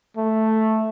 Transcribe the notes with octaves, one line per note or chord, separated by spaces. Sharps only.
A3